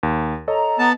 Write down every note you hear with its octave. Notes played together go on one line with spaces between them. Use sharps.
D#2
A4 C#5 D#5 A#5
B3 A5